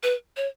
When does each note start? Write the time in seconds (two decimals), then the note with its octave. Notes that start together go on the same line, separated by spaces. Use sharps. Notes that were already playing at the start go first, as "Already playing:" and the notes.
0.03 B4
0.37 C#5